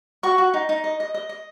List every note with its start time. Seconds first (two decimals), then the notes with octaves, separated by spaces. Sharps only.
0.23 F#4 C#6
0.38 F#4
0.54 D#4
0.69 D#4
0.84 D#5
1.00 D#5
1.14 D#5
1.29 D#5